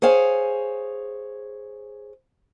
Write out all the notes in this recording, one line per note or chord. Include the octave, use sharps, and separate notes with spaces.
G#4 C5 C#5 F5 G#5